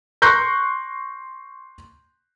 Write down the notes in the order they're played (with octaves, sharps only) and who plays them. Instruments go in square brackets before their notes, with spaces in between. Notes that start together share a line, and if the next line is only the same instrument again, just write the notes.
[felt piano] C6 C#6 F#6 G6 A#6